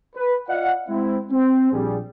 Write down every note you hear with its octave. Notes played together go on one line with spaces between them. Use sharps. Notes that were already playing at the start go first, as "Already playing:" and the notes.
B4
F4 D5 D#5 F5 F#5
G#3 C4 E4
C4
A#1 G3 G#4